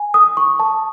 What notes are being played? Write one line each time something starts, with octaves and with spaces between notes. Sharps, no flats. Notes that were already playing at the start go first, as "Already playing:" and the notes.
Already playing: G#5
D#6
C#6
A5